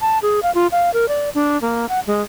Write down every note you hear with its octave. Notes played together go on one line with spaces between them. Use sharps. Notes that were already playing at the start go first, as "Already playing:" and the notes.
A5
G#4
F5
F4
F5
A#4
D5
D4
A#3
F#5
G#3